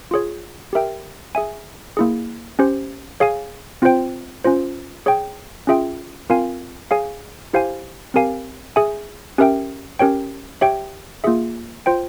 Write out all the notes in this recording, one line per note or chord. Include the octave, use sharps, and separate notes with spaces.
F4 G#4 C#5
G4 A#4 E5 G5
G#4 E5 G#5
A#3 E4 G#4
C#4 G4 C5
G#4 C#5 F5 G#5
C4 F4 C5 G5
C#4 F4 C5
G#4 C#5 G5
C#4 F4 G#4 E5 G5
C4 F4 A#4 F5 G#5
G#4 C#5 F5 G#5
E4 G4 C5 F5 G#5
C4 G4 A#4 F5 G#5
G#4 E5 G#5
C#4 G4 A#4 E5 G5
C#4 G4 A#4 C#5 G5
G4 C#5 E5 G5
A#3 F4 G#4 E5
F4 C5 G5